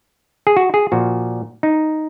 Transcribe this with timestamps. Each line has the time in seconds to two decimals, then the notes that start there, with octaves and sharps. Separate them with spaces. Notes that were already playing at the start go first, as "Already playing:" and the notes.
0.47 G#4
0.57 F#4
0.74 G#4
0.92 A#2 F3 F#4
1.63 D#4